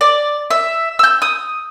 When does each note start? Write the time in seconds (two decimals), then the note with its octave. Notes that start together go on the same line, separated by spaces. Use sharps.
0.01 D5
0.51 E5
0.99 E6 G6
1.22 D#6